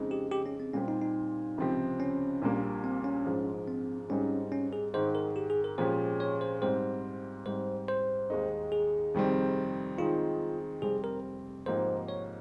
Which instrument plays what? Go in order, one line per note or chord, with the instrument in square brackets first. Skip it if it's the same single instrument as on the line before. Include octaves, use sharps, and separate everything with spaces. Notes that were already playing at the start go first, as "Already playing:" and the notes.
Already playing: [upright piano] F2 C#3 G#3 D#4
[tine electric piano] G4
G4
C#4
C4
[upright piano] A#2 G3 C4 G4 [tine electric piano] C#4
[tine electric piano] D#4
D#4
[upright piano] C#2 C3 F3 C4 G4
[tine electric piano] C#4
[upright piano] A#1 A#2 G3 A#3
[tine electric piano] C4
C#4
[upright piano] G#2 F3 G#3
[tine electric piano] C4
[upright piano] G#2 G3 C4 D#4 G#4 [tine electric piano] C#4
[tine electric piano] C#4
G#4
[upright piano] G#2 D#3 G#3 [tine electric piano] C5
[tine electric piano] A#4
G4
G#4
A#4
[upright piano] A#2 F3 G#3 C#4 G4 [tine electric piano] C5
[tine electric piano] C#5
C5
[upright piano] G#2 G3 C4 [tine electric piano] C5
[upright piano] G#2 G3 C4 [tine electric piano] C5
[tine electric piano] C5
[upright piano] D#2 D#3 G#3 D#4
[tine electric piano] G#4
[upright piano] F2 C3 D#3 G3 C4
[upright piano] D#3 G#3 C4 D#4 [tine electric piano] F4
[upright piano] F1 F2 C3 G3 C4 [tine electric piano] G#4
[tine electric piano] A#4
[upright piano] G#2 F3 A#3 D#4 G4 [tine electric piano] C5
[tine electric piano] C#5